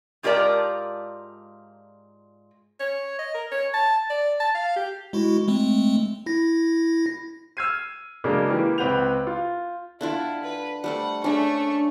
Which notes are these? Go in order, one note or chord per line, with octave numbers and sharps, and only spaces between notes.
G#2 F4 G4 A#4 D5 A5
C#5
D#5
A#4
C#5
A5
D5
A5
F5
G4
G#3 E4 F#4
G#3 A3 C4
E4 A#6
E6 F6 G#6 C7 D#7
C#3 F#3 G#3 A#3 D4 A#4
E3 A#3 G4
C#2 C4 B4 F#5 G6 F7
F4
D3 D4 E4 F4
B4
G3 A3 C5 F#5
A3 C#4 D4 G#4 C#6